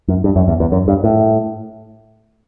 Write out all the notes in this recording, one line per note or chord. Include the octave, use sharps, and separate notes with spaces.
F#2
G2
F#2
E2
E2
F#2
G2
A2